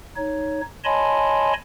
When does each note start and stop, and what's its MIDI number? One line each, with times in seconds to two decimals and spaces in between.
0.16 0.61 63
0.16 0.61 73
0.84 1.53 73
0.84 1.53 75
0.84 1.53 80
0.84 1.53 81
0.84 1.53 83
0.84 1.53 84